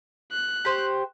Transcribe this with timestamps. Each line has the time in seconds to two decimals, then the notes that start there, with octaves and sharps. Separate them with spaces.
0.32 F#6
0.65 G4 C5 C#6